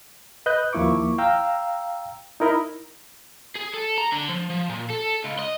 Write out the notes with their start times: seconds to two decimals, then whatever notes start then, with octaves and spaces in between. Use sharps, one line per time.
0.46 B4 D#5 F#6 G6
0.73 D#2 F3 A#3 E4 C#6 D6
1.18 F5 G5 A#5 E6
2.40 D#4 E4 A#4 D#5 B5
3.55 G#4
3.74 A4
3.98 A#5
4.12 D3
4.29 F3
4.50 F3
4.70 A#2
4.90 A4
5.24 C#2
5.39 D#5